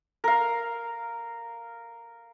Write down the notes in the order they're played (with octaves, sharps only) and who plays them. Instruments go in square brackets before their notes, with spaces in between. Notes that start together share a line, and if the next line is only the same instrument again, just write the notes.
[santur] A#4 F5